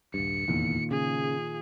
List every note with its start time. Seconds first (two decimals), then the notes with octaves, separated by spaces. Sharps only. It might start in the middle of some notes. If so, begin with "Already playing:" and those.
0.14 D#1 G2 C#7
0.48 F1 E2 A#2 D#3 F3
0.91 C#3 G#4